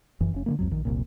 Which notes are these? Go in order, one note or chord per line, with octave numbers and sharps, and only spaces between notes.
F#1 F#2 E3
F1 C#4
D3 E3 A#3
C2 F2 F#3
A#1 D#3
F1 C2 A#2